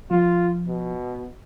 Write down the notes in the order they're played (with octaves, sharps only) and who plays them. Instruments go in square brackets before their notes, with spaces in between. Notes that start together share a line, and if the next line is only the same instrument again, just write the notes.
[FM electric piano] F3 [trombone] F4
[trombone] B2